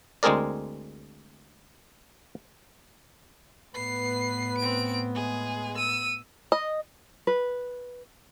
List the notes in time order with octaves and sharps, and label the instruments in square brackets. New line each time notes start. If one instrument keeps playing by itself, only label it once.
[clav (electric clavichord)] D2 G#3 C4 G#4 A#4 D5
[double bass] A2 B3 [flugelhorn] B4 [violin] C7
[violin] C4 D7
[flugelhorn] G#3 [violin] G#4
[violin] E6 D#7
[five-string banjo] D#5
[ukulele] B4